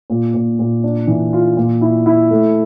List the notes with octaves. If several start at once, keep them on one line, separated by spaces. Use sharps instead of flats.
A#2
A#2
A#2
D4
E3
F4
A#2
E4
E4
A3